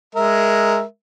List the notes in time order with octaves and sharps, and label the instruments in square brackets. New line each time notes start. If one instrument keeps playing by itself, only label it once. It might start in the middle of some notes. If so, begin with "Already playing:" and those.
[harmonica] G#3 A#4 E5